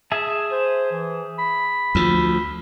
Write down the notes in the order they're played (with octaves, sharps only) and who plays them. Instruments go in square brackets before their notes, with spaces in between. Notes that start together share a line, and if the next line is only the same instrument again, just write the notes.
[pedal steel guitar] G#4 E5 A5
[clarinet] C5
E3
B5
[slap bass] D2 F3